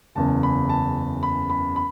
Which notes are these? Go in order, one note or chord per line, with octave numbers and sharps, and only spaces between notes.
F#1 E2 C#3 A5
B5
A5
B5
B5
B5